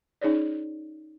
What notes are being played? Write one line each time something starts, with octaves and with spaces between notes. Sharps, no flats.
C#4 D#4 G#4 C#5 D5